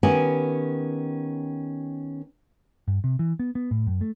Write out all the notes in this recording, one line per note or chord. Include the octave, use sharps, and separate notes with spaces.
D#3 B3 C#4 G4 F#5 G#5
G2
C3
E3
B3
B3
A2
F#2
A3